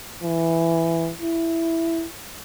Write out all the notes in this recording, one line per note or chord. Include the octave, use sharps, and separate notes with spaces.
E3
E4